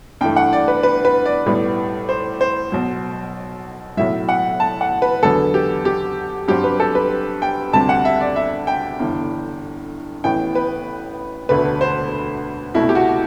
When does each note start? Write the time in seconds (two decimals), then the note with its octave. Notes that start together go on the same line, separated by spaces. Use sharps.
0.21 G2 E3 A3 G5
0.36 F#5
0.53 D5
0.68 B4
0.83 B4
1.05 B4
1.26 D5
1.46 B1 A2 G3 B3
2.09 C5
2.41 C5
2.72 B1 B2 F#3
3.97 B1 A2 F#3 E5
4.29 F#5
4.60 A5
4.81 F#5
5.02 B4
5.23 E2 D3 F#3 B3 A4
5.54 G4
5.85 G4
6.48 G2 F#3 C4 G4
6.64 B4
6.80 A4
6.95 B4
7.42 G5
7.73 D2 C3 G3 C4 A5
7.89 F#5
8.05 E5
8.20 D5
8.36 E5
8.67 G5
8.99 G1 G2 E3
10.24 A1 A2 E3 B3 G5
10.55 B4
11.49 E1 D2 D3 A3 B4
11.81 C5
12.74 C2 B2 A3 E4
12.89 G4
12.95 F#4